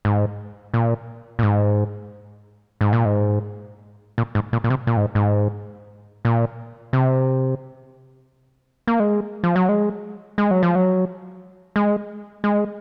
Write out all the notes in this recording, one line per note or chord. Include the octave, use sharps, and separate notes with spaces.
G#2
A#2
A#2
G#2
G#2
A#2
G#2
A#2
G#2
A#2
A#2
C3
A#2
G#2
G#2
A#2
C3
A#3
G#3
F3
F#3
G#3
G#3
F#3
F3
F#3
G#3
G#3